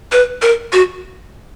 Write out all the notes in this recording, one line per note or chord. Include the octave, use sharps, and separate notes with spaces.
B4
A#4
F#4